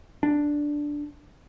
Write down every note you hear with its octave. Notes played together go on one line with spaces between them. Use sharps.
D4